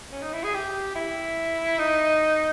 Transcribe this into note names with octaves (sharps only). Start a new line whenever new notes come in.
C#4
D#4
E4
G#4
G4
E4
D#4